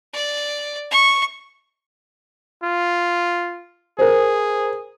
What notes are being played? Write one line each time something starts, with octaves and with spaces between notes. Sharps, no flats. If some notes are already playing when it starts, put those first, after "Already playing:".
D5
C#6
F4
G#4 A#4 C5